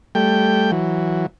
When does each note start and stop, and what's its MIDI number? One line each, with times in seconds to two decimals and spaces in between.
0.15 0.71 55
0.15 0.71 57
0.15 0.71 79
0.72 1.26 52
0.72 1.26 54